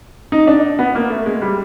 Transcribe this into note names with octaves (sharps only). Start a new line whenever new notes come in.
D#4
D4
B3
A#3
A3
G#3
G3